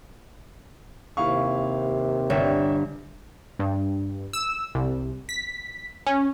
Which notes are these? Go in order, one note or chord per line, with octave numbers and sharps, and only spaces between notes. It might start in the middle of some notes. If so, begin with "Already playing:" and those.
D#2 C3 E4 F5 C#6
G1 C#5 E5 G5
G2
E6
C2
B6
C#4